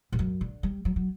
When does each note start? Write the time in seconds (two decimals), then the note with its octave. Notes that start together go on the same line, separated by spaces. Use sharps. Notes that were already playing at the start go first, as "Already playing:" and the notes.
0.12 G2
0.19 F#2
0.41 D3
0.63 G3
0.85 F#3
0.96 F#3